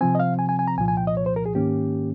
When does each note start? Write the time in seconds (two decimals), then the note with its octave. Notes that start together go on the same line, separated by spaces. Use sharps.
0.01 C3 F3 C4 G#5
0.15 D#5
0.20 F5
0.39 G#5
0.49 G#5
0.59 G#5
0.68 A#5
0.78 C2 A#2 F3 G#5
0.88 G#5
0.97 G5
1.07 D#5
1.17 C#5
1.26 C5
1.36 A#4
1.46 G#4
1.55 G#2 D#3 A#3 C#4 G4